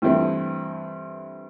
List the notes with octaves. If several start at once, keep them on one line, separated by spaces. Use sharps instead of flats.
G2 E3 A3 C4 E4